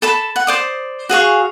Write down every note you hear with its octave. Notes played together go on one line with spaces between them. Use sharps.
A4 A5 B5
F#5
C5 D5 D#6
F#4 G#4 F5 C#6